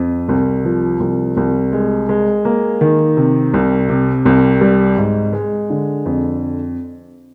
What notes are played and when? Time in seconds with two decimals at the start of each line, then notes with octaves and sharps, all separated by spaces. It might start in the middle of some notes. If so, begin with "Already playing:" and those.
Already playing: F2
0.29 C2
0.64 F3
1.00 C2
1.37 C2
1.73 G#3
2.09 G#3
2.45 A#3
2.81 D#3
3.17 C3
3.54 C2
3.89 C3
4.25 C2
4.61 G3
4.97 G#2
5.33 G#3
5.70 D3
6.06 F2